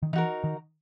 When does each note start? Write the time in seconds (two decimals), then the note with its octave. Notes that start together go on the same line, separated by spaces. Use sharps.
0.03 D#3
0.13 E3 D#4 F#4 A#4
0.44 D#3